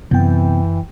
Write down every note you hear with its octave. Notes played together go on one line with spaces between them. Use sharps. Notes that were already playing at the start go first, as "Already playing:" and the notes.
F#2 C3 E3 B3 C4 G5